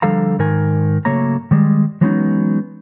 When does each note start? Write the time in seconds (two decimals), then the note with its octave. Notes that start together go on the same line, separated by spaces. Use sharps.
0.02 D3 F3 G3 A4 F5 A#5
0.39 G#2 D#3 A#4 G#5
1.05 C#3 F#3 A3 A#3 C#5 A#5
1.51 D#3 G3 G#3
2.01 E3 F#3 G#3 B3 C#4 D#4